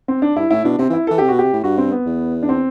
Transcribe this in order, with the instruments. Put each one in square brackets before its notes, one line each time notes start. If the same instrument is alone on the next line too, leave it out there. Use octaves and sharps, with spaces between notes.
[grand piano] C4
D4
[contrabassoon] G2 [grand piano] E4
[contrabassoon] A2 [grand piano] E4
[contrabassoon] B2 [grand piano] D4
[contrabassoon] C3 [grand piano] C4
[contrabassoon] E3
[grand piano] E4
[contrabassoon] E3 [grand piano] A4
[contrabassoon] C3 [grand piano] G4
[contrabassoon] B2 [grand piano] F#4
[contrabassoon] C3 [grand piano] G4
[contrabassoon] A2
[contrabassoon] G2 [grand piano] F#4
[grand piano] C4
B3
[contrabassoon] E2
[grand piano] D4
C4